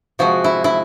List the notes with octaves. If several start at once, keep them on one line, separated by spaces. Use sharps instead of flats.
C3 F3 G#3 F#4
E4
E4